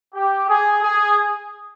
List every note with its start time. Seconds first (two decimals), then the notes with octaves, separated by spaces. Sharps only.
0.14 G4
0.48 G#4
0.82 G#4